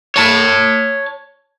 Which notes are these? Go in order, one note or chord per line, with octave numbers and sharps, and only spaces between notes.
C#5 A5